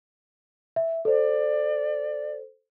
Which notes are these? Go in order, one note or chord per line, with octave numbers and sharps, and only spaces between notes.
E5
A4 C5 D5